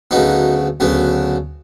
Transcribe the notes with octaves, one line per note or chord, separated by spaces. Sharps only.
D2 C#3 F#3 B3 D#4
D2 C#3 F#3 B3